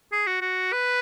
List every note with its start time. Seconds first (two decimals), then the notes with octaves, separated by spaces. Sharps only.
0.12 G#4
0.27 F#4
0.42 F#4
0.73 B4